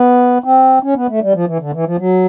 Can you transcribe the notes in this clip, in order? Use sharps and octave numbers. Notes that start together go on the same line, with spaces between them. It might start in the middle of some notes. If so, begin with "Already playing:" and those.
Already playing: B3
C4
C#4
B3
A3
G3
F3
E3
D3
E3
F3
F#3